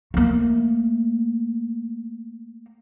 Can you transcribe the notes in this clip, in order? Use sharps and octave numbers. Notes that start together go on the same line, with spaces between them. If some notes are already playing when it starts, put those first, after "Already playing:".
A3 A#3